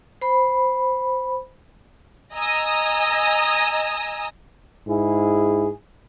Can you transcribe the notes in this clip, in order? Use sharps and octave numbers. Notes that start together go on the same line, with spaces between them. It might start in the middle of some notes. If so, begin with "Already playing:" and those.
C5 B5
D#5 G#5 A#5 D#6 E6
G#2 E4 G#4